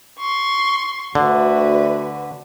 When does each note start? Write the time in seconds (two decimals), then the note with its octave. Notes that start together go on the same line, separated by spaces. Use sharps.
0.19 C6 C#6
1.15 D2 D3 F#4 B4